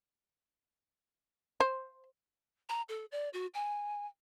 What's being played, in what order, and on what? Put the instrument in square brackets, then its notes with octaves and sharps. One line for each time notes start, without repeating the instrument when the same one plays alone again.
[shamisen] C5
[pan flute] A#5
A4
D5
F#4
G#5